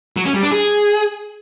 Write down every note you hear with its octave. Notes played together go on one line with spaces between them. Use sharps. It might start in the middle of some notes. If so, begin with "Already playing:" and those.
F#3
C#4
G3
D4
G#4